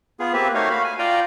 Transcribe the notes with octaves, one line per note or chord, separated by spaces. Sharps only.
B3 F4 G#4
A#3 C4 G4 B4 E5
A3 A#3 D#4 F#4 C#5 F5
F#4 F5 B5
G#5
F4 D5 F5 G5 A#5